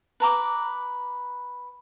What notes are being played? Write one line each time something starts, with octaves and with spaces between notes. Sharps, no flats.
B4 A#5 D6